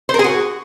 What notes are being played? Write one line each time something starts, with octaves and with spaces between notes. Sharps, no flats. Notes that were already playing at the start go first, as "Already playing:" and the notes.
C5
A#4
G#4
F#4